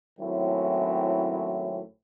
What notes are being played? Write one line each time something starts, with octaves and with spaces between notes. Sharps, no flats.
G#1 A2 F#3 C4 C#4 E4